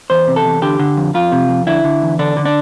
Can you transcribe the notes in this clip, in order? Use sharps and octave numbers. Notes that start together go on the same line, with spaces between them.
E2 C5
C3
A4
E2
D3 G4
D3
F2
F2 F4
C3
F2
D3 E4
D3
E2
D3 D4
D3
D4